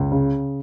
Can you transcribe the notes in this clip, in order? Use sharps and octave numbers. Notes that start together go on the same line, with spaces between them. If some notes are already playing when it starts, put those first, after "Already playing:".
Already playing: C#2
C#3